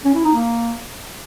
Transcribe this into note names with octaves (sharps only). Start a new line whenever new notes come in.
C#4
E4
D#4
A#3